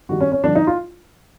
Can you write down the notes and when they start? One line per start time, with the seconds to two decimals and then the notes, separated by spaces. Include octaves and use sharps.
0.09 G2 D#3 G3 F#4
0.21 C#4
0.32 C#4
0.43 G2 D3 F3 D4
0.55 D#4
0.67 F4